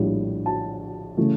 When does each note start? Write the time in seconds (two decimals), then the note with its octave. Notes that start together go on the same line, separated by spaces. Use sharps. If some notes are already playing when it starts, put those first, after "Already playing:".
Already playing: A#1 A2 G3 D4
0.46 A5
1.17 C#3 E3 A3